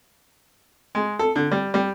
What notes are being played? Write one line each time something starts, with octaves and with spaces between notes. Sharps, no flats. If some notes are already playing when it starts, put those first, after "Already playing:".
G#3
A4
D3
G3
G3